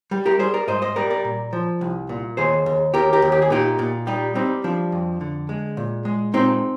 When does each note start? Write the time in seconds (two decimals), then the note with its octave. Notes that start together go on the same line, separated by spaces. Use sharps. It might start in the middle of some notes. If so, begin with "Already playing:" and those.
0.11 G3
0.26 G4 A#4
0.39 G3 G#4 C5
0.54 A#4 D5
0.67 G#2 C5 D#5
0.82 C5 D#5
0.96 G3 A#4 D5
1.10 A#4 D5
1.25 A#2
1.53 F3
1.81 C2
2.09 A#2
2.37 D#2 G#4 C5
2.66 D#2
2.94 D#2 G4 A#4
3.13 G4 A#4
3.22 D#2
3.32 G4
3.42 G#4
3.50 A#2 D#4 G4
3.79 A#2
4.07 G3 D#4 G4
4.35 G3 C4 D#4
4.64 F3 D4
4.92 F2
5.21 D3
5.49 G#3
5.77 A#2
6.05 G#3
6.34 A#2 C4 D#4